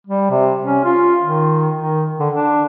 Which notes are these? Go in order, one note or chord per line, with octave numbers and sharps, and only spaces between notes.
G3
C3
C#4
F4
D#3
D#3
D3
D4